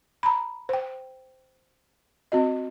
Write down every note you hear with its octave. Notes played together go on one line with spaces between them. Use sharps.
A#5 B5
C5 G5
C4 F#4 D#5